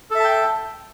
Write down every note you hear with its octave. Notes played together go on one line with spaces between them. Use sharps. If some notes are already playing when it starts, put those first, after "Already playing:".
A4 E5 G5 A5